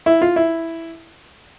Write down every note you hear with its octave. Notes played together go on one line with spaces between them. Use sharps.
E4
F4
E4